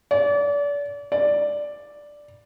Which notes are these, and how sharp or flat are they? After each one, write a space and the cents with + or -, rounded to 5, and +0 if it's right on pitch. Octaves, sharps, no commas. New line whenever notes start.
D5 -35
D5 +0